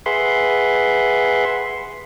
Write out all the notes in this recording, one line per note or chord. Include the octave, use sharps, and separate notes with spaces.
G#4 B4 E5 F#5 C6